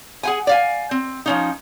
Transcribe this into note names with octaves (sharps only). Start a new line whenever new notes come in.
G#4 F#5 G#5
D5 F5 G#5
C4
F3 C#4 D#4